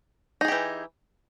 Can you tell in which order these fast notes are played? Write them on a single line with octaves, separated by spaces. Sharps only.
D#4 G#4 G4 E3